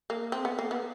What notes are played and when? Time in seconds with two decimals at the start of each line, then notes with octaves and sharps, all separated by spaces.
0.10 A#3
0.32 C4
0.45 B3
0.59 A#3
0.71 B3